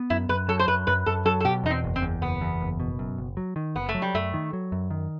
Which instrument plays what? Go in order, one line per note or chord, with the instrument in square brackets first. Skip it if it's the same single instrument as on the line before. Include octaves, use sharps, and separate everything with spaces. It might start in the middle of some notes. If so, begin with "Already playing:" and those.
Already playing: [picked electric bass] B3
[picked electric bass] F#2 [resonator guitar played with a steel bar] E4
[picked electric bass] F#2 [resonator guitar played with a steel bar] B4
[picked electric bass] F#3 [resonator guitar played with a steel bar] A4
[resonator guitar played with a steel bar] C5
[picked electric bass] F#2 [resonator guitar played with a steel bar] B4
[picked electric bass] F#2 [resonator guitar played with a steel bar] B4
[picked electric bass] F#2 [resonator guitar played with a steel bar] A4
[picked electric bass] F#3 [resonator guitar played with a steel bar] A4
[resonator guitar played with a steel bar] A4
[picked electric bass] B2 [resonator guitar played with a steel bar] G4
[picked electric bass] E2 [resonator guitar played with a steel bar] D#4
[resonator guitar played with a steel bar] C4
[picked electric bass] F#1
[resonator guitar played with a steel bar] C4
[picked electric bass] E2
[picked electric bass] F#1 [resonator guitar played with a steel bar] B3
[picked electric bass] E2
F#1
B2
F#2
F#1
F#3
D#3
[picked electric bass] F#1 [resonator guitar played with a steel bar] B3
[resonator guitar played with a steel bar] A3
[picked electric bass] F#3
[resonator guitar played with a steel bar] G3
[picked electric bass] F#2 [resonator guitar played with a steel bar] A3
[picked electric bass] D#3
F#3
F#2
D#3